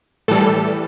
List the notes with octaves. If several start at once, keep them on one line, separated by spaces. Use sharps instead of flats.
A2 E3 G3 A4